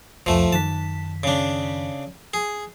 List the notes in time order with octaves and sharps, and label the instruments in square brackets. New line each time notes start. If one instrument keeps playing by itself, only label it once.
[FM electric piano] C2 F2 [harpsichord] F3 A3
[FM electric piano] F#2 D#3 B6 [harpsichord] A5
[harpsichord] C#3 D4
G#4